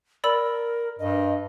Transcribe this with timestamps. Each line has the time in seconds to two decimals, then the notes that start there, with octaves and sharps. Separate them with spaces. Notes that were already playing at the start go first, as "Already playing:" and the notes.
0.24 A#4 D5 B5 E6
0.99 G2 D#5